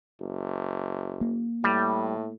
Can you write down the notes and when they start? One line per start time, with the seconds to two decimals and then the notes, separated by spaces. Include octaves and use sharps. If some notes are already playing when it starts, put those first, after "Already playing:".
0.21 F#1
1.21 A#3
1.64 A2 G3